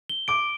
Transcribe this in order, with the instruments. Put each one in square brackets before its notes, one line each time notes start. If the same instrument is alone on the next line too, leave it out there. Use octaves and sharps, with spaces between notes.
[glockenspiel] G7
[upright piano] D6 [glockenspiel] D7